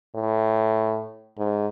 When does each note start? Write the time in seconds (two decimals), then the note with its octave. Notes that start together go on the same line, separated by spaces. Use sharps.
0.15 A2
1.38 G#2